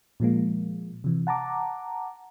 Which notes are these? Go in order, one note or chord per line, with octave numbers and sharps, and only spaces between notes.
A#2 F3 G#3 A#3
C3 E3
F#5 A5 A#5 D6